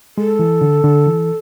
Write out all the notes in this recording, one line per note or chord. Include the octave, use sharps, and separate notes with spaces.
G#3 A4
E3
D3
D3
E3